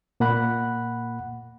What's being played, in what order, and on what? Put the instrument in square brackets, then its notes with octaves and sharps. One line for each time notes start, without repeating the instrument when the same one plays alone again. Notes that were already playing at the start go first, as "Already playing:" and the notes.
[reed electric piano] A#2 A#3 F#5 B5 F#6